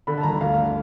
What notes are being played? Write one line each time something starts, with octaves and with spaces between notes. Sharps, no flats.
D3 B5
A5
G1 A#5
D2 F5
D3